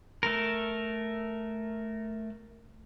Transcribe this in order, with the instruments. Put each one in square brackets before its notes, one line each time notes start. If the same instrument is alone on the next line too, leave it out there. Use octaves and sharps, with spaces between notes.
[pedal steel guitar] A3 A#4